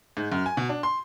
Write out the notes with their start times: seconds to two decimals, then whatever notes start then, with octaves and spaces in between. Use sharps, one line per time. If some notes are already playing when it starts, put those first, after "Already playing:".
0.17 G#2
0.32 F#2
0.46 G#5
0.57 B2
0.69 D4
0.83 C6